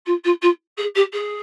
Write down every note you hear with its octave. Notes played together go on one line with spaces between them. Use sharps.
F4
F4
F4
G#4
G4
G#4